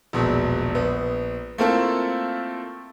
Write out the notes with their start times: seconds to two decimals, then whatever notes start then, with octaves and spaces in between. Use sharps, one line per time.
0.13 E1 A#1 B2
0.75 A#1 B3
1.58 A3 A#3 C4 E4 F4 A4